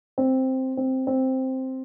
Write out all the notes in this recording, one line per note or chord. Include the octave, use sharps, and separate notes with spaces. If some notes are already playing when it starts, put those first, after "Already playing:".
C4
C4
C4